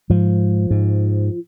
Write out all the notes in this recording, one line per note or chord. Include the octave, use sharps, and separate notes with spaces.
G#2 F3
G#2